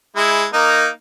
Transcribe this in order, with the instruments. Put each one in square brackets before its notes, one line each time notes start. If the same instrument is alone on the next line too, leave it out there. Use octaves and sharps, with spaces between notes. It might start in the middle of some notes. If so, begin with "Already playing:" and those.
[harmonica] G#3 E4
A#3 D#4